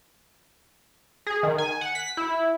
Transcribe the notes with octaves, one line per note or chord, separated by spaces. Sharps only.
G#4
D#3
G#5
F#5
B6
E4